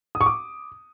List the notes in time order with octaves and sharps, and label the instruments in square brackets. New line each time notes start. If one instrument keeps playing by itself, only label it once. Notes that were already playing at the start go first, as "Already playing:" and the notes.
[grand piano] D#6
C#6
D6